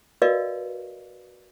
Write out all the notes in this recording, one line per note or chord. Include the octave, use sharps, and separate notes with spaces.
F#4 A#4 B4 D5 D#5 F5